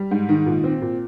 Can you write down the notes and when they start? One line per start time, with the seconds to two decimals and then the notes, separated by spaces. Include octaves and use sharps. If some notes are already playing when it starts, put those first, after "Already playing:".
Already playing: G3
0.11 G#2
0.29 D#3
0.46 A#2
0.64 C4
0.82 A#2